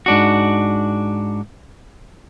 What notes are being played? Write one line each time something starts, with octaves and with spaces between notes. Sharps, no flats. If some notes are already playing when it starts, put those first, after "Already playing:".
G#2 D4 F#4